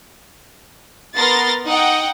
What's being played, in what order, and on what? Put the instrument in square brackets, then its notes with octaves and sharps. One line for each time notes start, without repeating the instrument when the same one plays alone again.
[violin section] B3 A#4 C6 A6 A#6 C7
D#4 D#5 F#5 G5